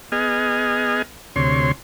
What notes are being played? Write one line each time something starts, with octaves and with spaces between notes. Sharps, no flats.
B3 G#4 D#5 G#5 F6
D2 C3 C#5 C6